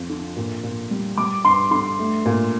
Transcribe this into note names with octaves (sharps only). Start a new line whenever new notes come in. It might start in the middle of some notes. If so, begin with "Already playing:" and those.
Already playing: F2 F3
D3
A#2
A#2
G3
G3 D6
G2 C6
D3 C6
A3
A#2